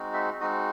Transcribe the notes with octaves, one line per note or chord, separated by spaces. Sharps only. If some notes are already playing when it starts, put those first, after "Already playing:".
Already playing: G#3 C4 D#4 F#4
E5
G#3 C4 D#4 F#4 D#5